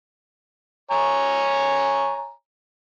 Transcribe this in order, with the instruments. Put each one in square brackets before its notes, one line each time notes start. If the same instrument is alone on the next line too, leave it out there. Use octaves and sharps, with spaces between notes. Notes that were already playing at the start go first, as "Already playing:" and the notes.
[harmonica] C#5 G#5 A#5